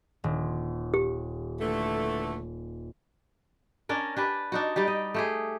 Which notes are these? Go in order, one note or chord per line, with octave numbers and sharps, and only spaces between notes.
D#1
G4
D3 E3 A3
C#4 D4 A#4
D4 G4 B4
D4 D#4 F#4
G3 D#4 G4
D#5
A3 G4 G#4